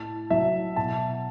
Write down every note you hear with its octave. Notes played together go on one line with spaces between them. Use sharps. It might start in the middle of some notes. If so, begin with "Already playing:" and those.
Already playing: A2 E4 A5
F#3 E5
B2 A5